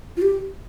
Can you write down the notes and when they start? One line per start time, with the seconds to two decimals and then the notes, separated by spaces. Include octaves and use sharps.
0.17 F4
0.22 G4